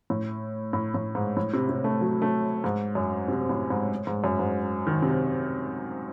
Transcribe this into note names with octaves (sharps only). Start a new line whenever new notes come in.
A2
A2
A2
G#2
A2
C3
C3
A3
F#3
A3
G#2
F#2
C3
A2
G#2
G#2
F#2
G#2
D#3
C3